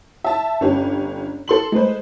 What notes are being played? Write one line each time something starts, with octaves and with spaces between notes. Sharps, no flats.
E5 A5
G1 C#4 G4
A4 C6 F#7
G#3 A3 B4 C5